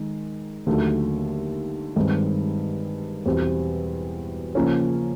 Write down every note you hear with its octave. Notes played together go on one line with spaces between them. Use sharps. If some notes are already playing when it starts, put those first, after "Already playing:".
Already playing: D#3 G#3
D#2 D3 F#3 A3
G2 D#3 G#3 C4
E2 B2 G3 C4
C#3 F3 A#3 C#4